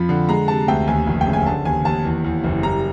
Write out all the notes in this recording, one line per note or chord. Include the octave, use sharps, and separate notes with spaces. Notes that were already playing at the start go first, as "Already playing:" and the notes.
Already playing: F2 F3 B5
D3
G#3 A#5
C3 A5
D2 G5
D#2 G#5
F1
G5
C#3
G#5
D3 A5
D#2 G#5
D#2 A5
E2
E2
F#1
G3 A#5